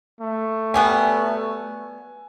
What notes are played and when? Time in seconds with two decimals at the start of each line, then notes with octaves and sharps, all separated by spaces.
0.21 A3
0.74 F#3 G3 B3 G#5